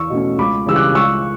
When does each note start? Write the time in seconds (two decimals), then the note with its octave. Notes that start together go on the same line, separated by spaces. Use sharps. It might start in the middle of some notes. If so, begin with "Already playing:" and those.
Already playing: E2 C#6 E6
0.10 B2 A3 C#4
0.38 C#2 B5 D6
0.66 C#3 E3 G3 E6
0.76 D6 F#6
0.94 C#2 C#6 E6